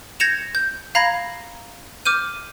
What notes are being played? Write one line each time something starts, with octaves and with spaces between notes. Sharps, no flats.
G6 G#6 A#6 C#7 E7 F7
G6
F5 A#5 B5 G#6 A#6
D6 F6 G6 D#7